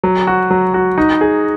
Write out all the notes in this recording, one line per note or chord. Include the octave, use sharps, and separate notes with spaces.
F#3
F#4
F#3
F#4
D#4
G#4